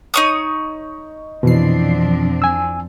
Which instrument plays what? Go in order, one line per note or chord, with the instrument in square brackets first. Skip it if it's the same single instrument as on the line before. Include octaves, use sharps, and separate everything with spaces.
[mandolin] D#4 C#5 D#6
[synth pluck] F2 E3 C7 [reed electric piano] B2 [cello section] F3 C4 D4
[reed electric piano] G#5 E6